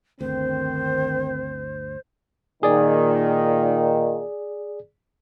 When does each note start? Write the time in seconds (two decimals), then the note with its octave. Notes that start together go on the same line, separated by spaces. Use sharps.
0.21 G1 D2 D#3 C4 C5
2.63 A#2 D#3 G#4 D5